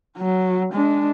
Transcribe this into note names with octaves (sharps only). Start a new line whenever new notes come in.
F#3
G#3 D4